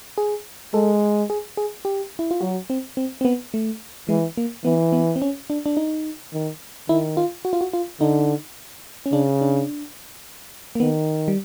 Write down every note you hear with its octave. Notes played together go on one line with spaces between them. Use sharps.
G#4
G#3 A4
G#4
G#4
G4
E4
F4
F#3 F#4
C4
C4
C4
B3
A3
E3 G#3
A#3
E3 B3
B3
C4
C#4
D4
D4
D#4
D#3
D#3 E4
F4
F#4
F4
F#4
F4
D3 D#4
C#4
C#3 D4
D4
A#3
D#3 B3
G3